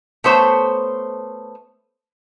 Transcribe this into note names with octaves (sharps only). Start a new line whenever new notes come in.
A3 B3 C5 C#5 A5